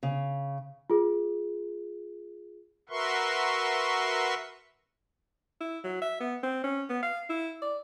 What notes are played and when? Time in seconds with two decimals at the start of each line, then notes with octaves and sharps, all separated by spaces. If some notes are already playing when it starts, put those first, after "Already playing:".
0.03 C#3
0.90 F4 G#4
2.89 F#4 A#4 B4 E5 C6 C#6
5.61 E4
5.84 F#3
6.02 E5
6.20 B3
6.43 C4
6.64 C#4
6.89 B3
7.03 F5
7.30 E4
7.62 D5